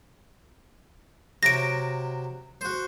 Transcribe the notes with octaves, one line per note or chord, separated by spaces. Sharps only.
C3 F#3 E5 A#6 D7
F#4 C5